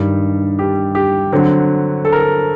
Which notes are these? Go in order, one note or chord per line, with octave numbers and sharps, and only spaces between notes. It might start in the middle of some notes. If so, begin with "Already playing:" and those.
Already playing: G2 D#3 G3
G4
G4
D3 F#3 C4
A4
A#4
A4